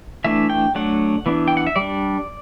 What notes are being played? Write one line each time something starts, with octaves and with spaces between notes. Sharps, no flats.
E3 A3 D4 E5
G5
F#3 A3 D4 F#5
E3 B3 D4
G5
F#5
E5
G3 D5
D4